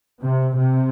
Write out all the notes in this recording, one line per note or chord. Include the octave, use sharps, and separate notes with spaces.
C3
C3